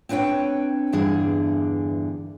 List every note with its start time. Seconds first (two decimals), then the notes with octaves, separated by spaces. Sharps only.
0.09 C4 D4 B4 C#5 G5
0.92 E2 G2 D3 E3 D4 G#4